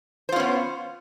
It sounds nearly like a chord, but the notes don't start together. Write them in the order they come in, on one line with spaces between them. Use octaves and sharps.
C5 F4 C#4 B3